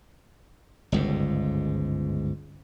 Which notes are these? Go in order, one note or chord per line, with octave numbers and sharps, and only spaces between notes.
G1 C#2 G#2